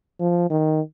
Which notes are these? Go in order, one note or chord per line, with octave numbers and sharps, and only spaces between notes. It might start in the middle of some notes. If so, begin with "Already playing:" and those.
F3
D#3